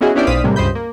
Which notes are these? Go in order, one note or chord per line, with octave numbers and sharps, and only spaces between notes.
B3 C#4 E4 F#4 G#4 D#5
B3 C#4 D4 E4 G4 D5
B1 C5 D5 F5 D#6 B6
A2 C3 G3 G#3 A#3
C#2 G2 C5 D#5 B5 G6
A#3